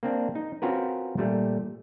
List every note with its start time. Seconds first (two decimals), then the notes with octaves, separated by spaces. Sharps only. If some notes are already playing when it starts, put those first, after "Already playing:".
0.03 A#3 C4 D4
0.35 D#4
0.62 C4 C#4 F4 F#4 A#4 B4
1.18 A#2 G3 A3